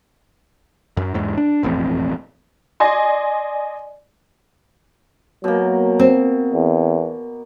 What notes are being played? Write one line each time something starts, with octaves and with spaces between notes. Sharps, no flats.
F#2
E2 G#2
D4
E1 A1 F2 C4
D5 D#5 G#5 C6
B2 F#3 A#3
C4
E2